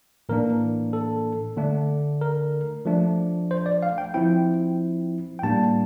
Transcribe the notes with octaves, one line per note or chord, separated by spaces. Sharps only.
A2 E3 A#3 D4 A#4
A4
D3 A3 D4
A#4
F3 A3 D4
C5
D5
F5
G5
F3 C4 E4 G5
G5
A2 G3 A#3 D4 A5